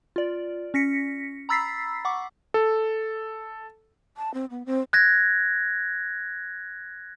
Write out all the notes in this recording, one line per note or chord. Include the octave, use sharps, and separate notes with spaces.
F4 D5
C#4 A#6 B6 C#7
A#5 B5 E6 A6 B6 C7
F#5 C#6 D6
A4
A5
C4
B3
C4
F#6 G#6 A#6